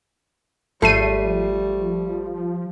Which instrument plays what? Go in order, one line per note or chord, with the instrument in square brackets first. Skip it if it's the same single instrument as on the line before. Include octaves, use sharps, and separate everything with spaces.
[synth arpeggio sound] G#1 C7 D#7 [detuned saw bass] F3 [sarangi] G3 [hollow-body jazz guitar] A3